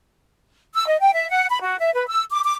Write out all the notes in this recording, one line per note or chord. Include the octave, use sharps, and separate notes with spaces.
E6
D#5
G5
E5
F#5
B5
F#4
E5
B4
E6
D6
D6